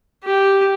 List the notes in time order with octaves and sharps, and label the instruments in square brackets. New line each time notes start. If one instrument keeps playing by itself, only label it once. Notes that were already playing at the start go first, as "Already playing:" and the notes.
[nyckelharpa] G4